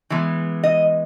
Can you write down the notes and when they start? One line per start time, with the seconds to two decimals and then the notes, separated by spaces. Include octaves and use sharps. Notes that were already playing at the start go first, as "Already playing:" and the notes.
0.10 E3 G#3 B3
0.64 D#5